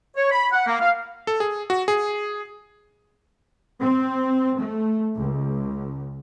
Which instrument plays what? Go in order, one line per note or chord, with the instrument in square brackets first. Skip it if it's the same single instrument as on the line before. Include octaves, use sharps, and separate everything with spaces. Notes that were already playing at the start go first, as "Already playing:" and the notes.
[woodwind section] C#5
B5
F#5
A#3
F5
[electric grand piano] A4
G#4
F#4
G#4
[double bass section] C4
A3
C#2